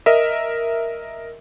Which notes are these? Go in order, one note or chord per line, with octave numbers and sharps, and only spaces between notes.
A#4 D#5 E5